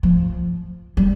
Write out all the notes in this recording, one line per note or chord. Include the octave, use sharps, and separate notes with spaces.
F3
G3